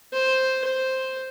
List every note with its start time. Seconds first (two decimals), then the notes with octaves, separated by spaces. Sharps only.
0.13 C5
0.64 C5